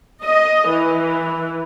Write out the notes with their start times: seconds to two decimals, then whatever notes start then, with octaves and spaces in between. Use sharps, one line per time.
0.22 D#5
0.67 E3